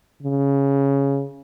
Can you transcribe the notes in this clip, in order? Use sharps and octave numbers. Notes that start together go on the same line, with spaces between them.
C#3